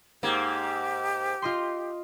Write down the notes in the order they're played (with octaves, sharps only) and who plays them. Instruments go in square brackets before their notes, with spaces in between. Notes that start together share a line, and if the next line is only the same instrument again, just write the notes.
[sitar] G#2 A#3 [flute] G4
[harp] F4 D#5 C6